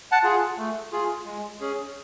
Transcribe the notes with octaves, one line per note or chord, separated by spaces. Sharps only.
F#5 A5
F4 G#4
A3
F4 G#4
G#3
C#4 G#4